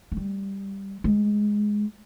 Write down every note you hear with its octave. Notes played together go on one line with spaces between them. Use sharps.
G#3
G3
G#3